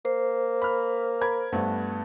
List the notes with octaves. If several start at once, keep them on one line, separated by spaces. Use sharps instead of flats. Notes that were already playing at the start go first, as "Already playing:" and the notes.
A#3 C5
B5 F6
A#4 B5 G#6
G2 A3 B3